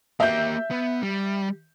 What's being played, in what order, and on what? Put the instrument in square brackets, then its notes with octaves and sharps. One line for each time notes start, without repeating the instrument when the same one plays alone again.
[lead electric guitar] A#3 G4 [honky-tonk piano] E5 G6
[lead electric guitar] B3
G3